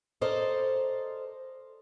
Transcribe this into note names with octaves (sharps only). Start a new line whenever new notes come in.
A4 A#4 C5 D5 D#5